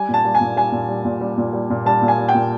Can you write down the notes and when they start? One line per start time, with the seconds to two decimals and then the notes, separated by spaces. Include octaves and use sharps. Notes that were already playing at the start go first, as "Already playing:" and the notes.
Already playing: G3 G#5
0.09 A#2
0.14 A5
0.25 G3
0.35 G#5
0.41 A#2
0.56 G3 G#5
0.72 A#2
0.88 G3
1.05 A#2
1.21 G3
1.38 A#2
1.53 G3
1.70 A#2
1.86 G3 A5
2.02 A#2
2.08 G#5
2.18 G3
2.28 G5
2.35 A#2